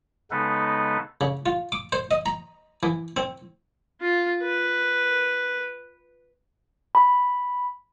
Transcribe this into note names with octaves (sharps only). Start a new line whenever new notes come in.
C#3 G#3 B3 D#4 A4 B4
C#3
F4
D6
C5
D#5
A#5
E3
C4
F4
B4
B5